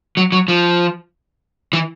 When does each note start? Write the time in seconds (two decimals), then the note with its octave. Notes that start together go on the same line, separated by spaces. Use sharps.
0.17 F#3
0.32 F#3
0.48 F3
1.73 E3